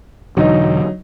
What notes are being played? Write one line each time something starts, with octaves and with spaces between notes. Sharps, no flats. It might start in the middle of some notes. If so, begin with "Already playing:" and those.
E1 D3 F#3 D#4